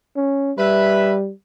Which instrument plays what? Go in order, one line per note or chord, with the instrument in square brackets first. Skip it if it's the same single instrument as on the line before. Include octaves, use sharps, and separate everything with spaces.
[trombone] C#4
[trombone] G3 [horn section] B4 E5